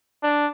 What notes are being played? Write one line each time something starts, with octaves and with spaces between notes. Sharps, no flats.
D4